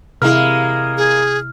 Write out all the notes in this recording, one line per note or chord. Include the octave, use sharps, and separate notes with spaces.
C3 G#3 A#3 E4 A#4 F6
G#4